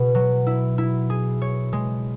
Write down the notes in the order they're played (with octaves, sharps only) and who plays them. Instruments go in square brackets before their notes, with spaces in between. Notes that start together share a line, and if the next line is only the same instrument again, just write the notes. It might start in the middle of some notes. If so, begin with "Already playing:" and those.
Already playing: [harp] B2 G#4
F#3
E4
E4
G#4
C#5
G#3